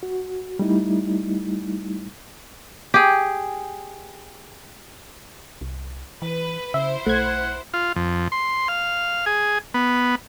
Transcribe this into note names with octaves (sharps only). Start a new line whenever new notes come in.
F#4
G3 A3 D#4 E4
G4 G#4
C2
E3 B4
C#3 E4 C5 E5
B1 A3 F#5 G#6
F4
F2
C6
F5
G#4
B3